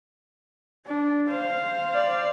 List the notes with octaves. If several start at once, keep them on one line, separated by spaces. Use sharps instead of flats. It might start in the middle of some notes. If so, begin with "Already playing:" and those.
D4
C5 F5
D5